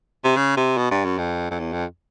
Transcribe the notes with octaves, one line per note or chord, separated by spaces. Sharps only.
C3
C#3
C3
B2
G2
F#2
F2
F2
E2
F2